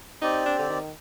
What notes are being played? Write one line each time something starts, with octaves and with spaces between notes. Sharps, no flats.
C4 D#4 G4 D5
D4
D3
D#3